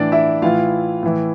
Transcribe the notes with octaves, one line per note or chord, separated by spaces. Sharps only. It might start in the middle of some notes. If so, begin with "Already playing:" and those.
Already playing: A2 E3 D4 D5
E4 E5
A2 E3 F4 F5
A2 E3